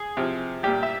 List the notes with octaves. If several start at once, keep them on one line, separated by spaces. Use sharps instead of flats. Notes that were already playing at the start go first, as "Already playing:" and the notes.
Already playing: G#4
C3 F3
A#2 G3 G4
E5